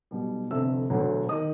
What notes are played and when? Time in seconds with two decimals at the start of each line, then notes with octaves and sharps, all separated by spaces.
0.11 B1 B2 G3
0.51 F1 F2 D3 E5 E6
0.90 E1 D2 D3 F#3
1.29 D#3 D#5 D#6